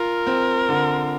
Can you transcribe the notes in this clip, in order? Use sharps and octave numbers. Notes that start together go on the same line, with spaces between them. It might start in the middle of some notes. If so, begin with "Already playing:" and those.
Already playing: F4 A#4
C4
D3